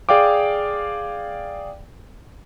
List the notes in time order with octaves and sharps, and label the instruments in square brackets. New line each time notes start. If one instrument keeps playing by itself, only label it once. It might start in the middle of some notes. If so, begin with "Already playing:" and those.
[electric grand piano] G#4 D5 F5 G5 D6